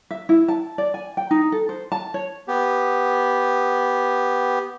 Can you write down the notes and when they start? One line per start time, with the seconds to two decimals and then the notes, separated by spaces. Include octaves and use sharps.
0.11 E5
0.29 E4
0.48 A5
0.78 D5
0.94 G#5
1.17 G5
1.31 D#4
1.52 A4
1.69 C5
1.92 A5
2.14 C#5
2.48 B3 G4